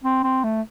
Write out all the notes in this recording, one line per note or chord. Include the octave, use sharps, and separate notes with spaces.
C4
C4
A3